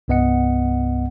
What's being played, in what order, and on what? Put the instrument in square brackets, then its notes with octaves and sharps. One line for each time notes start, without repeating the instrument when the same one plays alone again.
[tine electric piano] C2 G2 B3 D#5 F#5 C#7